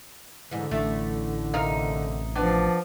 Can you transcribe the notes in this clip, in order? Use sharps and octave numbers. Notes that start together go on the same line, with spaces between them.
G#2 D3 E3
A1 A3 D4 E4
C3 D#4 A#4 F5
F3 B3 D4 D5